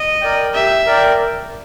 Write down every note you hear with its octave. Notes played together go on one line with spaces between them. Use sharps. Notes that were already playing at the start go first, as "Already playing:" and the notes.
Already playing: D#5
A#4 D5 G5
G4 E5
A#4 D5 G5